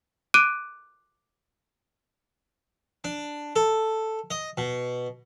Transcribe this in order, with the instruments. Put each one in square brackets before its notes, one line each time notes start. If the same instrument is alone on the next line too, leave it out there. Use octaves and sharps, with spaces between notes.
[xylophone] D6 F#6 D7 D#7
[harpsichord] D4
A4
D#5
B2